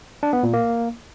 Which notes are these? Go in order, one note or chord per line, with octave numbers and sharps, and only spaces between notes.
D4
B3
A#2
A#3